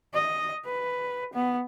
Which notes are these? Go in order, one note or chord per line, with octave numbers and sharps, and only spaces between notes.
D#5
B4
B3